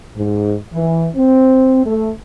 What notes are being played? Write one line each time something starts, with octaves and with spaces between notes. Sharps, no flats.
G#2
E3
C4
A3